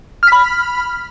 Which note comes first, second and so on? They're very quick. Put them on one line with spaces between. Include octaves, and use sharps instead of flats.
F6 B6 B5